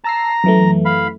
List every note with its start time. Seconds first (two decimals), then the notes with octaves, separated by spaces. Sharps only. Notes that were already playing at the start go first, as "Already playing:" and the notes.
0.04 A5 A#5 E6 C7
0.44 F#2 E3 A3
0.85 F5 B5